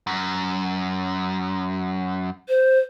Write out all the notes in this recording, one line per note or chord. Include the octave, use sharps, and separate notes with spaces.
F#2
C5